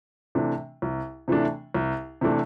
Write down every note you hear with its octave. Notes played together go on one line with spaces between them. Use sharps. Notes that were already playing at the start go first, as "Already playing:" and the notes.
C3 E3 A3 D4
C2
C3 E3 A3 D4
C2
C3 E3 A3 D4